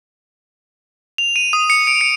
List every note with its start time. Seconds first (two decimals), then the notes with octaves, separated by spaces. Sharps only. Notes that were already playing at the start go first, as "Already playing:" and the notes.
1.18 F7
1.36 D#7
1.53 D#6
1.70 C#7
1.87 D7
2.01 C#7